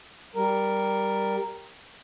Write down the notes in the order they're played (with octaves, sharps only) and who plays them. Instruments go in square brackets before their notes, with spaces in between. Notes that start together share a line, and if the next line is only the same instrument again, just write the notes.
[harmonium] G3 A#4